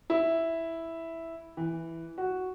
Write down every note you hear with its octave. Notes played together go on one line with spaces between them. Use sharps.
E4
E3
F#4